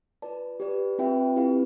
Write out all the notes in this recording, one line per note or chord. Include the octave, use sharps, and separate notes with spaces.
F4 B4 D5 A5
G4 B4 D5
C4 F4 B4 E5 G5
C4 E4 G4 B4 F5